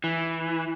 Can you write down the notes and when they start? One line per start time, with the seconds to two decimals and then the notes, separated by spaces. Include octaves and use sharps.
0.04 E3